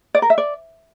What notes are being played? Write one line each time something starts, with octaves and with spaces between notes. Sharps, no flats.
D5
A#4
E5
D5